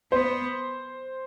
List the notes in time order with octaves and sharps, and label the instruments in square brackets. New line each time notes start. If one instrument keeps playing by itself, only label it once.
[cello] B3 [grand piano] C5